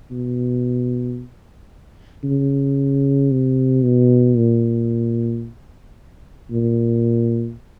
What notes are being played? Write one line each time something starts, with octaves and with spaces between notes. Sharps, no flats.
B2
C#3
C3
B2
A#2
A#2